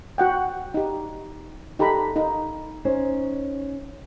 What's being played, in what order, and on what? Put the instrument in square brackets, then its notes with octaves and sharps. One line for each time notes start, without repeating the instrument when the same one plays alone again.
[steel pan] F#4 F#5 G5
D#4 G4
D#4 G4 A4 A#5 B5
D#4
[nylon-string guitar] C#4 D#4 C5 C#5